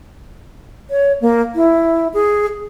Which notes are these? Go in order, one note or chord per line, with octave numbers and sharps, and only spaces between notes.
C#5
A#3
E4
G#4